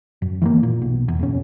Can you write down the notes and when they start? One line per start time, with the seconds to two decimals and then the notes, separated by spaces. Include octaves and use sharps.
0.22 F#2
0.42 E3 G3 A#3
0.63 A#2
0.82 B1
1.08 E2
1.19 F#1 B1 C#4